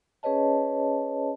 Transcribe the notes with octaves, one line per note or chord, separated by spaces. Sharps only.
C#4 G#4 B4 C#5 D#5 A5